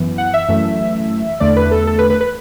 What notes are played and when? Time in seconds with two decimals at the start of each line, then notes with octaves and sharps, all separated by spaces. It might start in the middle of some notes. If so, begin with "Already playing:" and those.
Already playing: F#2 E3 B3
0.18 F#5
0.34 E5
0.49 F#2 E3 A3
1.40 E2 D3 A3 D5
1.56 B4
1.71 A4
1.87 A4
1.99 B4
2.10 B4
2.21 B4